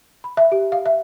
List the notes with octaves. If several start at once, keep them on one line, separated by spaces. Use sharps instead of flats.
B5
E5
G4
F5
E5